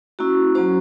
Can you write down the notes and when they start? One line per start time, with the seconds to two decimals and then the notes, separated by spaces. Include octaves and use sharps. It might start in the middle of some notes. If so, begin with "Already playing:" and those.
0.19 A#3 C#4 E4 F#4
0.55 F#3 A#3 C#4 F#4 C5